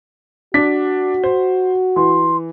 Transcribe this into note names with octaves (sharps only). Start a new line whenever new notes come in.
D4 F#4 B6
C5
E3 C6